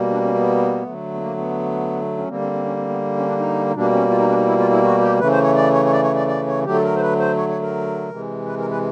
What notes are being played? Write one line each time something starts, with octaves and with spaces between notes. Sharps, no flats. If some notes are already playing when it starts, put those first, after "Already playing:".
Already playing: B2 G3 A#3
D4
C#4
B3
D3 F#3 A3
B3
A#3
B3
C#4
D3 G3 A#3 C4
C4
C4
C#4
C4
B3
C#4
D4
D#4
D#4
B2 G3 A#3 D4
C#4
F4
D#4
D4
D#4
E4
F4
E4
F#4
G4
C#3 E3 A3 B4
C5
C#5
D5
C#5
C#5
D5
C#5
D5
D5
C#5
D3 F#3 A3 G4
A4
A#4
C5
B4
C5
C#5
C#5
A#4
C3 E3 G#3
B4
A#4
B4